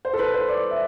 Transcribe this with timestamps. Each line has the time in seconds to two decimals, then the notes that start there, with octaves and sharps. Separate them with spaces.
0.05 C5
0.14 A4
0.19 B4
0.34 C5
0.48 D5
0.71 E5